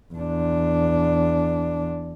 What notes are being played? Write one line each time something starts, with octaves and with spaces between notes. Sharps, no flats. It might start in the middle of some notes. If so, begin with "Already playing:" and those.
E2 D4